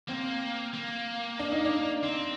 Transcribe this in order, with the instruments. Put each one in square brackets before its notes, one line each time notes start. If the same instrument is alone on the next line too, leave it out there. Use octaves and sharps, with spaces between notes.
[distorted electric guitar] A#3 [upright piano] C4
[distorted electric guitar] A#3
[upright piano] D4
D#4
D4
[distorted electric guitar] C4